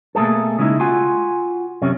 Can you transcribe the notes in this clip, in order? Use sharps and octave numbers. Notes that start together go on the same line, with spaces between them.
B2 A3 A#3 G#4 A4
C#3 G#3 D#4 E4
F4 F#4 G#5
F#2 C3 C#4